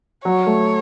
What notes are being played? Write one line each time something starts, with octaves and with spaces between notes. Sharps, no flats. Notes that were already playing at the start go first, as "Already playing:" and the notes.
F#3 C#5
A3